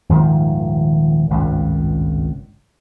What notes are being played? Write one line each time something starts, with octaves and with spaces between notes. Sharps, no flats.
D#1 G#2 D#3 F3
G#1 C#2 G2 A#2